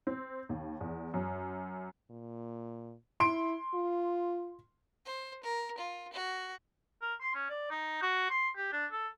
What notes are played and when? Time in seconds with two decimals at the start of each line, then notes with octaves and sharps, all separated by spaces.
0.07 C4
0.49 D#2
0.81 E2
1.14 F#2
2.10 A#2
3.20 E4 C6 D7
3.74 F4
5.05 C5
5.43 A#4
5.78 F4
6.13 F#4
7.02 A#4
7.21 C6
7.35 C#4
7.50 D5
7.71 D#4
8.02 F#4
8.30 C6
8.57 G4
8.72 D4
8.92 A4